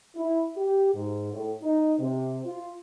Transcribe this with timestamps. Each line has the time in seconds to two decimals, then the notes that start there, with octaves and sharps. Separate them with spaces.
0.16 E4
0.57 G4
0.94 G#2
1.33 A2
1.62 D#4
1.99 C3
2.45 F4